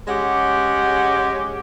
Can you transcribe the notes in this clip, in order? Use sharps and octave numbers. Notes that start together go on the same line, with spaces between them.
G#3 C#4 G4 F#5